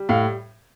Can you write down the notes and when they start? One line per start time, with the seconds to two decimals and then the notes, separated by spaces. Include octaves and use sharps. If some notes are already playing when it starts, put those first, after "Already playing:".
Already playing: G3
0.09 A2 F5